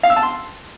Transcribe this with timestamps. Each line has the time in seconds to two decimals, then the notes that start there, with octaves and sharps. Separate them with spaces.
0.03 F5
0.10 E6
0.16 A5
0.23 C6